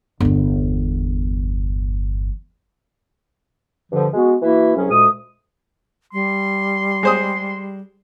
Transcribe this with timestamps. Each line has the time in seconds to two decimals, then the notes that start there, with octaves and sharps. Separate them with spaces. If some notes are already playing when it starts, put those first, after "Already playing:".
0.20 G1 E2
3.92 G2 D3 F3
4.14 G#3 B3 F#4
4.42 E3 A#3 E4 F#4 E5
4.76 C2 F#3 C#4 G#4
4.90 D2 A#2 G#3 D#6
6.13 G3 C6
7.03 G#3 C5 D#6